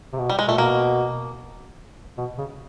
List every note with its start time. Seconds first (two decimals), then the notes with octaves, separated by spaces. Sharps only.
0.13 C3
0.18 B2
0.30 G3
0.39 G#3
0.47 A#2 A3
0.58 B2 A#3
2.18 B2
2.38 C#3